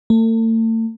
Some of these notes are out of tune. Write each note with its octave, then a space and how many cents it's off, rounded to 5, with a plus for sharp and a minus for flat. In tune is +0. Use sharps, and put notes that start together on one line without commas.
A3 +40